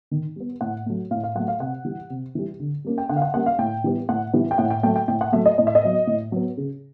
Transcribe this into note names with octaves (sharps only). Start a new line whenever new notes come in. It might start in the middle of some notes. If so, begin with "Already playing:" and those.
D#3
G3 B3
A2 F#5
F#3 A3
A2 F5
F5
F#3 A3 F#5
F5
C3 F#5
E3 G3
C3
E3 G3
D3
G3 A#3 C#4
G5
D3 F#5
F5
F#5
G3 A#3 C#4 F#5
F5
A2 G5
E3 G3 B3
A2 F#5
E3 G3 B3
G5
A2 F#5
G5
F#3 A3 G5
G5
A2 G5
F#5
F#3 A3 E5
D#5
A2 D#5
E5
D#5
F#3 B3
A2
F#3 B3
C#3